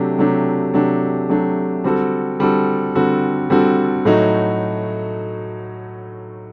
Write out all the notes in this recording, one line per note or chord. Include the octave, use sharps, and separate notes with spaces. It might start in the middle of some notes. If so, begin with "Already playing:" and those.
Already playing: C3 F#3 A3 D4 G4
C3 F#3 A3 D4 G4
C3 F#3 A3 D4 G4
C3 F#3 A3 D4 G4
D3 G3 C4 F#4 A4
D3 G3 C4 F#4 A4
D3 G3 C4 F#4 A4
D3 G3 C4 F#4 A4
A2 F#3 A3 D#4 F#4